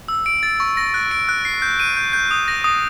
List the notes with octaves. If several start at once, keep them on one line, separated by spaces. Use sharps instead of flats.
E6
D7
A6
C#6
A#6
F#6
D7
F#6
C7
G6
D#7
G6
G6
D#6
A#6
D#6